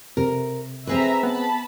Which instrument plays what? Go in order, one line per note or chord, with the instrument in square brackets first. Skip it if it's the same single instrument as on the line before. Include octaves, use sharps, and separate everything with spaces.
[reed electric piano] C3 [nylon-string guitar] A#4
[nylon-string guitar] C4 G#4 B4 [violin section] E5 A#5
[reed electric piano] B3 [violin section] A5 B5